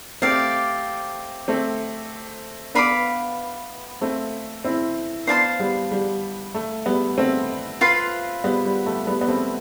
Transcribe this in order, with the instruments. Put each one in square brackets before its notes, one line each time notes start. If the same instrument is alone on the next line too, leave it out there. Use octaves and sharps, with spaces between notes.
[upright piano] A3 C4 [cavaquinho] G4 D5 F5
[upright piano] A3 C4
[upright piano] B3 D4 [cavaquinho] B4 F5 B5 D6
[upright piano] A3 C4
C4 E4
[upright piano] B3 D4 [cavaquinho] C5 F5 A5 C6
[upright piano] G3 B3
G3
A3
G3 B3
A3 C4
[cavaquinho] F4 B4 F5 C6
[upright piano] G3 B3
G3
A3
G3 B3
B3
A3 C4